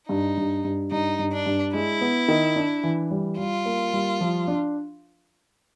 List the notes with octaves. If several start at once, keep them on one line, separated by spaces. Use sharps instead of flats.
G2 D#4
G2
G2
G2 D#4
G2
D4
G2
G#3 E4
B3
D#3
D4
E3
G3
G3 F4
A#3
G3
F3
D4